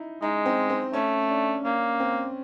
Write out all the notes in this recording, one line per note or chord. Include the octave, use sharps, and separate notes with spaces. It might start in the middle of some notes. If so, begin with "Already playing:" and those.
Already playing: D#4 E4
G#3 D#4
C4
C4
A3 C#4
D4
A#3 C#4
C4